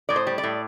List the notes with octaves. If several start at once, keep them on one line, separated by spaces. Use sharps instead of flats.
A2 D5
C5
G3
D5
A2